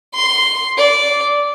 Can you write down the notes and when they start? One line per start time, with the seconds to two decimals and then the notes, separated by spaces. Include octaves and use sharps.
0.14 C6
0.78 D5